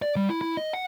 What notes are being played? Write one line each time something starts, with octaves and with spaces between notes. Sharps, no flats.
D5
G3
E4
E4
D#5
F#5